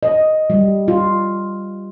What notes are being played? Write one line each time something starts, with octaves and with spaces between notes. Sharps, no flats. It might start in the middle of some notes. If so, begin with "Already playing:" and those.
D#5
G3
F4